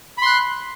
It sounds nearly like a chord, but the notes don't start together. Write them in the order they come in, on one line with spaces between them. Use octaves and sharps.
B5 C6 F#6